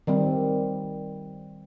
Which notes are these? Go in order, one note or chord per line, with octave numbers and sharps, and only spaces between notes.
D#3 G3 C4